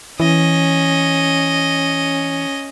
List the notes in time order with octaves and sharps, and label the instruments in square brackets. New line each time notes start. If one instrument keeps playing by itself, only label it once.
[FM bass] E3 [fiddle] C#4 D#5